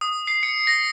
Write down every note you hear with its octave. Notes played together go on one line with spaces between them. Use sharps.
D#6
C7
C#7
A#6